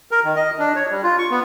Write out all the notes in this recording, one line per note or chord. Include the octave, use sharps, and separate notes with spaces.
A#4
D#3
D#5
D4
C#5
G3
F4
C#6
B3